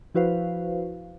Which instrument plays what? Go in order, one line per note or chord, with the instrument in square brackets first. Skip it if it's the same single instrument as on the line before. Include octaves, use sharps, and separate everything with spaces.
[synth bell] F3 E4 F#4 B4 C5 F5